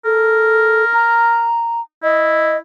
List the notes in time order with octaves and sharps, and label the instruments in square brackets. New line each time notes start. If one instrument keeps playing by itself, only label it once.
[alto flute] A4 [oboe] A#4
[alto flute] A#5
[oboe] E4 [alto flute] D#5